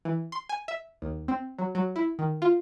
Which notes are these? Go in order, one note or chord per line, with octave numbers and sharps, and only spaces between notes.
E3
C6
G#5
E5
D#2
C4
F#3
F#3
E4
D#3
F4